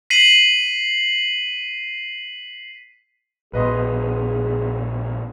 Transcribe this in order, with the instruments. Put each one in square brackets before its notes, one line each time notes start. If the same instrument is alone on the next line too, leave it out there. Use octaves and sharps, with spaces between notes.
[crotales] B6 C7 D#7 F#7
[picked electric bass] A#1 B2 [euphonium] G#4 [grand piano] B4 D#5 C6